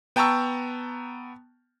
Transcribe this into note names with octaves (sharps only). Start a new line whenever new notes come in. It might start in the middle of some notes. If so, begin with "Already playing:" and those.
B3 G5 A5 A#5 C#6 E6